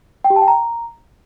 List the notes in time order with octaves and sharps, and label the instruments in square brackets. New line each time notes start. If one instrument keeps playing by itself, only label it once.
[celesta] G5
G4
A5
G5
A#5